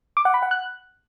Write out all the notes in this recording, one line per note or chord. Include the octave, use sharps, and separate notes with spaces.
D6
F#5
B5
F#5
F#6